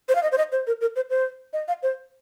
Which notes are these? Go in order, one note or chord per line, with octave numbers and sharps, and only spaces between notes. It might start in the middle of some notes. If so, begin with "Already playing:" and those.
C5
F5
D#5
C5
D#5
C5
A#4
A#4
C5
C5
D#5
F5
C5